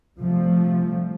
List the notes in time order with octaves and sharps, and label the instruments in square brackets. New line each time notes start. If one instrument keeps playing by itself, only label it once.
[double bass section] C3 F3 G3 A3